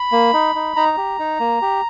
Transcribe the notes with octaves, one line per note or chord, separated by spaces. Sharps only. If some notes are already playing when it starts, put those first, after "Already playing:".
Already playing: B5
A#3
D#4
D#4
D#4 A#5
G4
D#4
A#3
G4